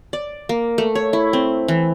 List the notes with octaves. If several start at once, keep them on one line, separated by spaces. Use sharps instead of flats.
D5
A#3
A3
C#5
E4
C4
E3